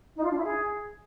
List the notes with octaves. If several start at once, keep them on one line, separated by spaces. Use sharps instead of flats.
D#4
F4
D4
E4
G#4